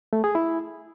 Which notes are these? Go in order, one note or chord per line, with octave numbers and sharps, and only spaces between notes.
A3
G#4
E4